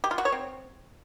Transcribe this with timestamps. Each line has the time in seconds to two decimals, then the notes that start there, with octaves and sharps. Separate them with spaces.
0.04 G4
0.11 F4
0.18 F#4
0.25 C#5
0.32 C4